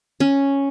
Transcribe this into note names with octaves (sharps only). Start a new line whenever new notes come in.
C#4